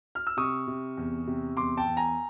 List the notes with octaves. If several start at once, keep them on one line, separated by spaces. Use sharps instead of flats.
F6
E6
C3 C#6 D#6
C3
E2
C3
E2 C6 D6
G5 A5
E2
G#5 A#5